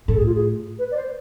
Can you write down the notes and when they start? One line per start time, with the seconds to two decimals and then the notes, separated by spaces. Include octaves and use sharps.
0.08 A2 A4
0.17 G#4
0.26 F4
0.35 G#4
0.79 B4
0.91 D5
0.96 C5